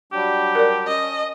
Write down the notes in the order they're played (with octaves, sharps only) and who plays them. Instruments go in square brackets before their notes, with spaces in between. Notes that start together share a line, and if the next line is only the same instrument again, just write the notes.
[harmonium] F#3 G3 D4 [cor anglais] G4
[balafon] A#4 D5
[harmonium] C#4 A5 [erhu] D#5